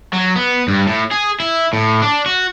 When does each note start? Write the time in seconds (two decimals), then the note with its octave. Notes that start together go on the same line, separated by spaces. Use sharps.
0.13 F#3
0.36 B3
0.68 G2
0.87 A2
1.12 G#4
1.40 E4
1.73 A2
2.02 D4
2.26 F#4